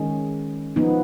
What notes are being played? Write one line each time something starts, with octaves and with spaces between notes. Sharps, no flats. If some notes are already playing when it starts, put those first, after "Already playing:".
Already playing: D#3 G#3 C#4
F3 B3 D#4